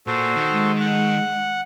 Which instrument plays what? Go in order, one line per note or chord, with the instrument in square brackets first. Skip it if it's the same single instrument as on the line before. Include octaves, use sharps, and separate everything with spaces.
[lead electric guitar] A#2 [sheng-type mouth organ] F#4 A4 C5
[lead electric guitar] D#3
[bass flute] G#3
[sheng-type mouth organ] F#5